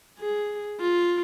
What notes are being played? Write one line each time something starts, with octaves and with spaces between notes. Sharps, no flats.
G#4
F4